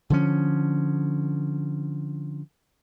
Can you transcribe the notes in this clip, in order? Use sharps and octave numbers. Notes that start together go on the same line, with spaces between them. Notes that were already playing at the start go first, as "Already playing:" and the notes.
D3 F3 C#4